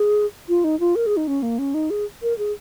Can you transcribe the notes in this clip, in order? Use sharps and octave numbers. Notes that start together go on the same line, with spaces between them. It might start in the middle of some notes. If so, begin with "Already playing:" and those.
Already playing: G#4
F4
D#4
F4
A#4
G#4
D#4
C#4
A#3
C#4
D#4
G#4
A#4
G#4